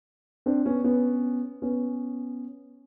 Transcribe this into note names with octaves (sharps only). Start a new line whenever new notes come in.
C4 D4
B3 C#4
B3 C#4
B3 C#4